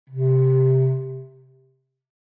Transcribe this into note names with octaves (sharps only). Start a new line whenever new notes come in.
C3